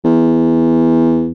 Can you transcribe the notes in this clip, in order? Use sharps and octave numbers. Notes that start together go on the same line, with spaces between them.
E2